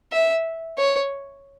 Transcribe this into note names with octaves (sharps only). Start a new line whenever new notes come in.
E5
C#5